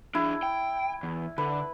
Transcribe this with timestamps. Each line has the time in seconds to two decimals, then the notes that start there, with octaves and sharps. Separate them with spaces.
0.15 D4 E4 G#4
0.43 G5
1.03 E2
1.38 D3 B4